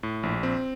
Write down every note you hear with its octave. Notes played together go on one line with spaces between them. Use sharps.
A2
A#1
C4